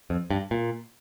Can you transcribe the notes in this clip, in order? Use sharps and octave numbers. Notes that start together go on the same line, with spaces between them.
F2
G2
A#2